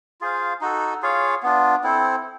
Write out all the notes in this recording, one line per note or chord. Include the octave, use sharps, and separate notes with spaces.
F4 G#4 C5 F5
D#4 F#4 A4
F4 G#4 C#5 F5
B3 D4 F4
C4 E4 A4 C5